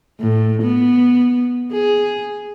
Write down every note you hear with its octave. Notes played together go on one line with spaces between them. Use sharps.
A2
B3
G#4